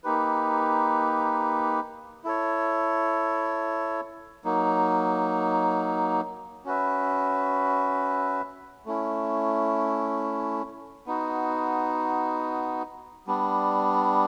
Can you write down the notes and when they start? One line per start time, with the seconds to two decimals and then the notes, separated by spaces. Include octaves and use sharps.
0.04 A#3 D#4 G4 B4
2.24 E4 A4 C#5
4.45 F#3 A#3 D#4
6.65 C#4 F#4 B4 E5
8.86 A3 C#4 E4
11.07 B3 D#4 F#4
13.27 G3 B3 D4